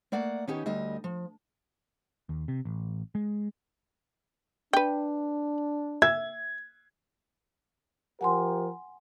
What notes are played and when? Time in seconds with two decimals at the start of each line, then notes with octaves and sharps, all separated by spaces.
0.12 A3 A#3 D5 F#5
0.48 D#3 B3 C#4 D#4 G4 G#5
0.66 D2 G3 D#5
1.04 F3
2.29 D#2
2.48 C3
2.65 A1
3.15 G#3
4.73 D4 B4 G5
6.02 E5 G#6
8.21 F3 G4 A#4 F#5 G#5 C6